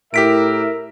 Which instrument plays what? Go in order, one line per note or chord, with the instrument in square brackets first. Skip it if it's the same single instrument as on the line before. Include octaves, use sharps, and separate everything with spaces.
[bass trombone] A2 [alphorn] E4 [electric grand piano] G4 B6 D7 [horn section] A#4 E5